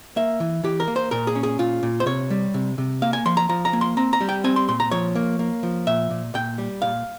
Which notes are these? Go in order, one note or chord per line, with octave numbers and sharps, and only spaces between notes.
A#3 E5
E3
E3 G4
A#4
A#3
C5
A#2 A#4
G#4
C#4
G#4
A#2 F4
A#2
C5
C3 C#5
G3
C3
C3
A#3 F5
G#5
F3 C6
A#5
F3 A#5
A#5
A#3
C6
C4 A#5
A#5
G3
G5
C4 G#5
C6
A#2 C6
A#5
F3 C#5
A#3
A#3
F3
A#2 E5
A#2
A#2 G5
G3
A#2 F5